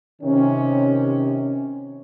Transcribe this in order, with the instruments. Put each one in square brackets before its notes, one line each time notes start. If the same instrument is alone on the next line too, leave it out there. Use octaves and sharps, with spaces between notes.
[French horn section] C3 D#3 C#4